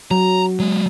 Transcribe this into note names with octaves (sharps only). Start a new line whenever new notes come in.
F#3 A#5
F#3 G#3